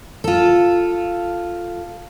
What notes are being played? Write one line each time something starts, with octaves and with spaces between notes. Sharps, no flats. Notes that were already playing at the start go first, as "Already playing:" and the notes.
F4 A4